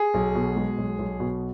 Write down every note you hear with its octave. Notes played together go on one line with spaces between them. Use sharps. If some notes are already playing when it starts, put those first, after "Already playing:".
Already playing: G#4
B1
B2
G#3
B1
B1
B2